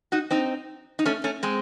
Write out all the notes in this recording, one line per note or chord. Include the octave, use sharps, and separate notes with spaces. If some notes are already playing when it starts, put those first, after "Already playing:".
D#4 F#4
C4 D#4
D#4
A3 C#4
A3 C#4
G#3 C4